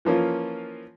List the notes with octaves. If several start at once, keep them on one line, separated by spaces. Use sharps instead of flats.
E3 F3 A#3 C#4 F4